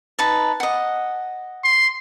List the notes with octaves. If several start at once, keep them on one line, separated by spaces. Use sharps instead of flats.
D#4 B4 A5
D#5 F#5
C6